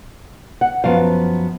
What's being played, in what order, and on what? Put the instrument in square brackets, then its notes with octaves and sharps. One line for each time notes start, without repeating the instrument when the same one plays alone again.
[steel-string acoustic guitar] F#5
F#2 F3 B3 F5